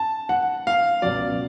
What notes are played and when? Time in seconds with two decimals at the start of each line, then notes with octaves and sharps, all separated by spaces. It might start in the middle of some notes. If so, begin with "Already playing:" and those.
Already playing: A5
0.29 F#5
0.67 F5
1.02 C#2 B2 F#3 D5